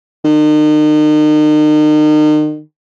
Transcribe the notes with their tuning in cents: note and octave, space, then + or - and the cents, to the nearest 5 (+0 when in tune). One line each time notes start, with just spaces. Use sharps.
D#3 -40